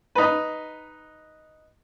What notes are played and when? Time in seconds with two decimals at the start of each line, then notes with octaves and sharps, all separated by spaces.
0.15 D#4 B4